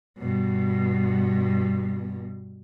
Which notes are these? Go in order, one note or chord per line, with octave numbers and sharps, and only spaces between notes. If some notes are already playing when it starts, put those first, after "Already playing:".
G2 B2